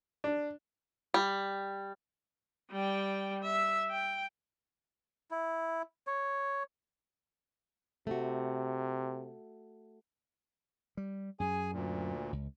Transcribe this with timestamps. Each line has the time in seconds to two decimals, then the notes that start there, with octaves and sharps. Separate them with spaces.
0.24 D4
1.14 G3
2.71 G3 G5
3.42 E5
3.90 G5
5.31 E4
6.07 C#5
8.07 C3 A3 F#4
10.97 G3
11.40 F#2 G#4 G#5
11.73 D2 A#2
12.33 C#2